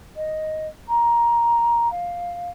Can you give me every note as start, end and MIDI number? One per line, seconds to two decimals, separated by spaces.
0.16 0.66 75
0.88 1.88 82
1.91 2.51 77